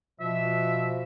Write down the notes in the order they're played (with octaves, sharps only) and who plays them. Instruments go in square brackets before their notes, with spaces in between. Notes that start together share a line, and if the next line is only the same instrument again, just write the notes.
[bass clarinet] B2 [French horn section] F3 [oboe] E5